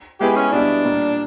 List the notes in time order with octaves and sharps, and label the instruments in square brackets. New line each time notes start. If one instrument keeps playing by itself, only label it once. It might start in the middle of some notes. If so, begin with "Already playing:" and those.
[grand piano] G#3 B3 E4 G#4 B4 [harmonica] G4
[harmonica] C#4
[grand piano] B2 G3 B3 E4 [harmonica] D4
[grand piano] A#2 G3 A#3